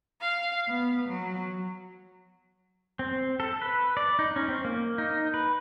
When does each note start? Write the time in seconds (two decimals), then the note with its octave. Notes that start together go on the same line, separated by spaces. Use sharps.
0.21 F5
0.69 B3
1.09 F#3
2.99 C4
3.40 A4
3.61 B4
3.97 D5
4.19 D#4
4.36 C#4
4.49 C4
4.65 A#3
4.98 D#4
5.34 B4